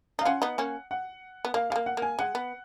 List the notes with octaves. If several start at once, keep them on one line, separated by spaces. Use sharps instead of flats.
D#4
F5
C#4 F4 F#5
B3 D#4
A#3 C#4
F#5
B3
A#3 F5
G#3 F5
A#3
F#5
A#3
G#5
G#3 F#5
B3